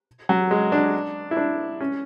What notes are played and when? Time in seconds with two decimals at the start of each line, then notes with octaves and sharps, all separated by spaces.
0.29 F#3
0.51 G#3
0.72 D4
1.31 E4
1.37 D4
1.80 C#4